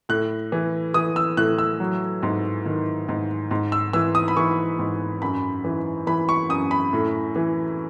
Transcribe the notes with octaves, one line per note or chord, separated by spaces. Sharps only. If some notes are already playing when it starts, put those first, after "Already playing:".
A2 F#6
E3
E3 D#6
E6
A2 F#6
E6
F#3
G#2
D#3
G#2
G#2
E6
E3 E6
D#6
B5
E3 C#6
G#2
F#2 B5
E3
E3 B5
C#6
F#2 D#6
B5
A2
E3